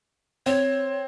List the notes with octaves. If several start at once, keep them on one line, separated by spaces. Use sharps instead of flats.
C4 C#5